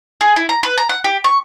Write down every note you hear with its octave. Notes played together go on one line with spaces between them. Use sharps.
G#4
E4
A#5
B4
A#5
F#5
G4
C#6